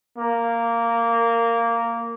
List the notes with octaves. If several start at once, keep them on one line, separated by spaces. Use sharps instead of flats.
A#3